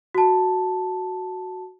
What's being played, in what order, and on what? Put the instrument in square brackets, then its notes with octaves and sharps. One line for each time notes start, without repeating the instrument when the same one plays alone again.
[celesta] F#4 A5